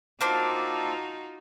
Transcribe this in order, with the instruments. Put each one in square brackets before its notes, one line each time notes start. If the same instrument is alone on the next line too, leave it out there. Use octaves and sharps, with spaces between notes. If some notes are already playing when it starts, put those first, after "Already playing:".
[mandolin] A#3 C4 D4 [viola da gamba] D#4 F4 F#4